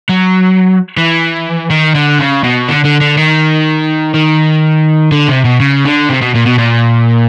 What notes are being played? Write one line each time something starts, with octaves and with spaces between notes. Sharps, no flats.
F#3
E3
D#3
D3
C#3
B2
D3
D3
D3
D#3
D#3
D3
C3
B2
C#3
D3
C3
B2
A#2
B2
A#2